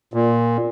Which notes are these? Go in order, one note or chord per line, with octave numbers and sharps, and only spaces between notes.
A#2